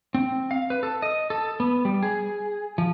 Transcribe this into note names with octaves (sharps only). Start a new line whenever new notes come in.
C4
F5
B4
A4
D#5
A4
B3
G3
G#4
F3